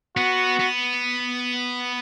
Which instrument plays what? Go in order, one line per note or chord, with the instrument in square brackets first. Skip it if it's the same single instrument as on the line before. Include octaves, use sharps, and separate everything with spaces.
[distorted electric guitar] B3 [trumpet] F#4
[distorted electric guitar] B3